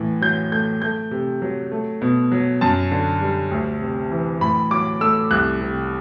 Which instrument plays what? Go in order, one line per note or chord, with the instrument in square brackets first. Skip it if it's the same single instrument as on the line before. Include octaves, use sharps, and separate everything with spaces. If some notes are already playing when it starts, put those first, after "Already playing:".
Already playing: [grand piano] A2 E3
F#3 G6
A3 G6
A3 G6
C3
F#3
A3
B2
F#3
F#2 A5
D3
G3
D2
C3
E3
A2 B5
F#3 D6
A3 E6
C2 F#6
C3